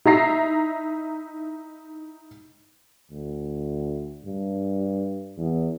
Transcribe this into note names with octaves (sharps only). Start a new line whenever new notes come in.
D#4 E4 E5 A#5 A#6 C7
D2
G2
E2